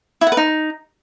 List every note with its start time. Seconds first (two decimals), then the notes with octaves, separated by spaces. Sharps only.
0.21 E4
0.27 F#5
0.32 B4
0.37 D#4